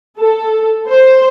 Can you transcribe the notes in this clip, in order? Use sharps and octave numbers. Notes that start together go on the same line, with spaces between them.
A4
C5